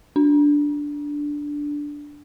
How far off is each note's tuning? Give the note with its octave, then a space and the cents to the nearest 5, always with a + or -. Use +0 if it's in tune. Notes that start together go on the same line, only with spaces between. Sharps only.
D4 -5